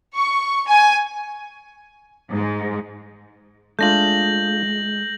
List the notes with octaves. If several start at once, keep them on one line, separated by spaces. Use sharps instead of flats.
C#6
G#5
G#2
G#3 A3 D4 F4 G6 A#6 F#7